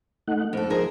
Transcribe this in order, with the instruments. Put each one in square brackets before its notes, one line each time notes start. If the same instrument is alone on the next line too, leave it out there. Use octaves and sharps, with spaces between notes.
[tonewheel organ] A3 D#4 F#5
[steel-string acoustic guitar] F2 A4 [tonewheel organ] A3
[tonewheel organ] F3 D#4 [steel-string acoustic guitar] G#4 A#4 C5